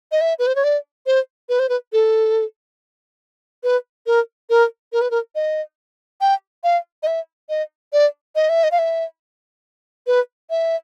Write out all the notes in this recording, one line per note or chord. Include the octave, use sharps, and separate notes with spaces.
D#5
E5
B4
C5
C#5
D5
C5
B4
C5
B4
A4
B4
A#4
A#4
A#4
B4
A#4
D#5
G5
F5
D#5
E5
D#5
D5
D#5
E5
D#5
F5
E5
B4
E5